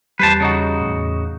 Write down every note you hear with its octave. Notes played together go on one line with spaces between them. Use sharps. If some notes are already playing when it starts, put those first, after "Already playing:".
E2 G3 B4 C5 A5
C#3 D#4 F#4
E2 A2